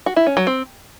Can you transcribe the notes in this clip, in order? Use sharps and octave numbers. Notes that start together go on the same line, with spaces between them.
F#4
E4
C#4
F#3
C4